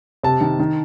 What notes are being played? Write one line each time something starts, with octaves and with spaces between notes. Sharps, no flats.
C3 A5
D#3
D#3